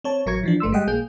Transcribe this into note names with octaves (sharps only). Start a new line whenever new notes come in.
C4 C#5 A5
A1 F#3 A#4 C#6 G#6 C#7
E3 F3 D4
G1 A3 C6 E6
G3 G#3 D#5 F#5 G5
A#1 A#3 G#4 G6